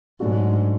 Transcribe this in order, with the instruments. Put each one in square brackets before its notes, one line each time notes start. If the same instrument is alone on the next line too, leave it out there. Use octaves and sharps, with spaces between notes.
[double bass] G#2 [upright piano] F#3 A3 D4 F#4